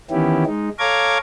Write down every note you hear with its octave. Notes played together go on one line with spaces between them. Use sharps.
D#3 E3 B3 C#4 E4 G4
G#3 D#4
A4 C#5 F5 A#5 D6 G#6